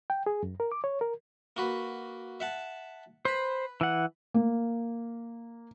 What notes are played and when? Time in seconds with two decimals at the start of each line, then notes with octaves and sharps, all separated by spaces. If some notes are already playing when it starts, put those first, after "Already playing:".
0.10 G5
0.26 G#4
0.43 F#2
0.60 A#4
0.72 D6
0.84 C#5
1.01 A#4
1.57 A#3 F#4 B4
2.40 E5 F#5 A5
3.25 B4 C5 B5
3.81 E3 F#5
4.34 A#3